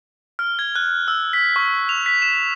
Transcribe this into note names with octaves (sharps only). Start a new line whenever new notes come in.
F6
G#6
F#6
E6
B6
C#6
F7
B6
E7